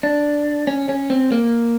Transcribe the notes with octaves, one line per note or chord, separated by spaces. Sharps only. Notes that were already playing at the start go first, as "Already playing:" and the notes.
D4
C#4
C#4
C4
A#3